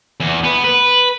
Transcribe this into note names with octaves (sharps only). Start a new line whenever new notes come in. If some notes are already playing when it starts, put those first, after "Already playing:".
E2
B3
B4